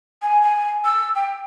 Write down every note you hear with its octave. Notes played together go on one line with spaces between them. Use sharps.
G#5
G#5
E6
G5